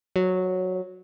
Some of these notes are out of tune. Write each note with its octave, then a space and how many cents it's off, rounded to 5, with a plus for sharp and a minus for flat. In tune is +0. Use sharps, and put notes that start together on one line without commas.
F#3 -5